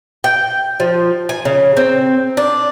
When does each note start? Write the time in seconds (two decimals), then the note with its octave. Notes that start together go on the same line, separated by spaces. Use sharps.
0.24 G5
0.80 F3
1.29 G#5
1.45 C#3
1.77 C4
2.37 D4